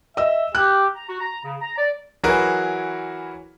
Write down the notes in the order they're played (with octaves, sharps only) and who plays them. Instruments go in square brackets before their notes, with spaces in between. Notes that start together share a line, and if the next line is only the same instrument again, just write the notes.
[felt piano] D#5 E6 [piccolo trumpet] E5
[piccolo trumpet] G4 [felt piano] F#6
[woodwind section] A#5
F#4
A#5
C#3
A#5
D5
[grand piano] E3 F#3 F#4 G#4 A#4 B4